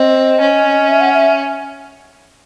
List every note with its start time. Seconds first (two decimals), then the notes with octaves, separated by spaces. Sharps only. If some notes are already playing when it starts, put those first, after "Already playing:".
Already playing: C4 D#5
0.41 C#4
0.89 E5
1.01 F#5
1.13 E5